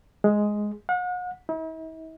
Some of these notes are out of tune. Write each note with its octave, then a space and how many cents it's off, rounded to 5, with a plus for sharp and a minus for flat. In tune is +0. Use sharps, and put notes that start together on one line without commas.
G#3 +5
F#5 -40
E4 -45